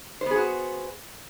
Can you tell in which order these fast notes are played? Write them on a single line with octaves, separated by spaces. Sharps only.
C5 B3 G#4 F#4